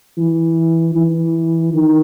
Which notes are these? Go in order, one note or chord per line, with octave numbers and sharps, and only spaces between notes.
E3
E3
D#3